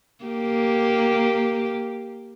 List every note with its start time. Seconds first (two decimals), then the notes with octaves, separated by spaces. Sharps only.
0.25 A#3 G4